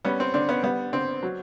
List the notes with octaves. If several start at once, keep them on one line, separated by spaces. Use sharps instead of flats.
G3 B3 C#4
C4
D3 C4 D4
B3 C#4
G3 B3
D3 C4
F#3